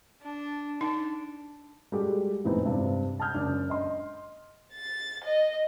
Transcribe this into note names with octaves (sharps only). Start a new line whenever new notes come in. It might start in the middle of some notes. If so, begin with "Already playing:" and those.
D4
D4 D#4
G3 G#3 F#4 G4 A4
F2 A2 E3 B3 C4 D#4
G2 C3 C4 D4
A5 D#6 F6 G6
F#1 D4
D#5 C6
A6
D#5